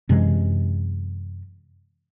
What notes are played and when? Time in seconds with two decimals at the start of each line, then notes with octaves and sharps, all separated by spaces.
0.09 F#2 C3 E3 G#3